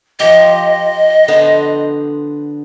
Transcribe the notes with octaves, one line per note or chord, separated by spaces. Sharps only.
F3 G4 D#5
D3 B3 C5